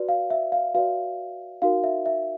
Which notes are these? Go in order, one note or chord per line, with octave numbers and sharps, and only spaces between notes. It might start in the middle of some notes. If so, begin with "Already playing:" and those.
Already playing: F#4 B4 D5
F5
E5
F5
F#4 B4 D5 F5
D#4 F#4 A#4 F5
E5
E5